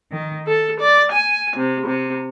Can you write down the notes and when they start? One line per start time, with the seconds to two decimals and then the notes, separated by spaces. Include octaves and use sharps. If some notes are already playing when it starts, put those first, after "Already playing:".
0.11 D#3
0.47 A4
0.80 D5
1.12 G#5
1.56 C3
1.85 C3